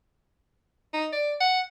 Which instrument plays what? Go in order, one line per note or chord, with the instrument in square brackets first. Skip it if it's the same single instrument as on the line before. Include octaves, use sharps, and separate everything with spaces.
[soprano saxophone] D#4
D5
F#5